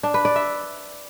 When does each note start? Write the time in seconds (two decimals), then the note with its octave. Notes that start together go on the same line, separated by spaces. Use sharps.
0.03 D4
0.14 B4
0.25 D5
0.36 E5